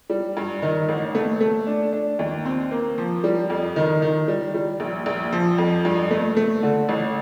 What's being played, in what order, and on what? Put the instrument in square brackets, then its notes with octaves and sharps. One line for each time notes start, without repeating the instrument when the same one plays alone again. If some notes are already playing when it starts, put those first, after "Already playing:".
[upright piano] G3
G2
D#3
A1
A3
A3
D4
D4
D#2
C4
A#3
F3
G3
F2
D#3
D#3
G3
G3
A#1
A#1
F3
F2
G2
A3
A3
D3
A1